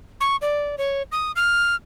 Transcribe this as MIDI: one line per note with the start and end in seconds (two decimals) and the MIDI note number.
0.20 0.36 85
0.41 0.76 74
0.78 1.03 73
1.12 1.32 87
1.36 1.75 89